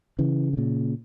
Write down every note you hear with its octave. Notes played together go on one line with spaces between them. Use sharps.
C#3 E3
D3
A#2 C#3